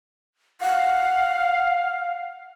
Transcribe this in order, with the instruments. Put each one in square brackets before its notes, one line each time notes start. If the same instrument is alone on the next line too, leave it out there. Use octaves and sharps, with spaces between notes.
[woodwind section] F5 [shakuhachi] F#5